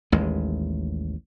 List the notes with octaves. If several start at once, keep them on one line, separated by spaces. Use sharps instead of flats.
A1 D#2 G#3